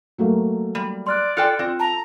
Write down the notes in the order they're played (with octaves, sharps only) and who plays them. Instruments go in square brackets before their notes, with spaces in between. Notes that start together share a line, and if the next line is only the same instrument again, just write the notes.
[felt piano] F#3 A3 A#3
[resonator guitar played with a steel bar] G3
[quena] D5 [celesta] C6 F6 F#6
[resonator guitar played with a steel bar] F4 A4 G5 [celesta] F6 F#6 C#7
[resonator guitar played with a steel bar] C4 [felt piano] F4
[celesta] A5 [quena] A#5